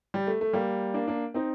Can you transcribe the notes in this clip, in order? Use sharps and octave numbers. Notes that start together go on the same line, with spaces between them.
G3
A3
A3
G3 A#3
A#3 D4
A#3 D4
C4 D#4